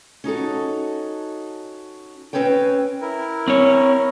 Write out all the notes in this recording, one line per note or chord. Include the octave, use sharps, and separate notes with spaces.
C#4 D#4 F#4 A4
C4 C#4 B4 C#5 G5
E4 A#4
C4 C#5